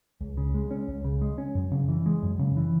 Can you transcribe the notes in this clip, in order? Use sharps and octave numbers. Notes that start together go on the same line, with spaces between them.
C#2
C#3
G#3
C#4
C#2
C#3
G#3
C#4
F#2
C#3
E3
G#3
F#2
C#3
E3